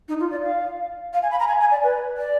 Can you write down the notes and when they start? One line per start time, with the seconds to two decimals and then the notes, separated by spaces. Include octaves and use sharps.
0.08 D#4
0.20 F4
0.31 D5
0.43 F5
1.13 F5
1.22 G#5
1.31 B5
1.39 A#5
1.48 G#5
1.60 G#5
1.71 D5
1.83 B4
2.17 D5